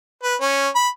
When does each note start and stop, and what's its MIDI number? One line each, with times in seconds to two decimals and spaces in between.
0.23 0.35 71
0.41 0.68 61
0.75 0.88 83